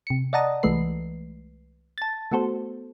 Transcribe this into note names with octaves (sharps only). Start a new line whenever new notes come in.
C3 C#7
D5 D#5 F#5 A5 A#5 D#6
C2 E3 G#3 A3 B4 C7
A5 A6
A3 B3 F#4 A4 C5